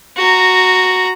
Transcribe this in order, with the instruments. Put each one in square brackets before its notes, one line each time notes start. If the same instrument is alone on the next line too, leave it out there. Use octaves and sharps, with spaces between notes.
[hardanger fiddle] F#4 A#5